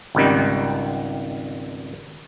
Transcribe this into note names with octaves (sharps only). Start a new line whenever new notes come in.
G#1 C#2 D#3 G3